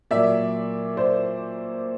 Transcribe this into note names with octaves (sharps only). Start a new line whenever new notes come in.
A#2 F#3 D5 E5
C5 D5